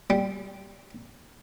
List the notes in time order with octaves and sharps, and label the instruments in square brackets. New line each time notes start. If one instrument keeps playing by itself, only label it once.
[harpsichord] G3